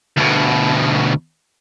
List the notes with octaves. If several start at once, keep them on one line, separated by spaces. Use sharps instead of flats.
D2 B2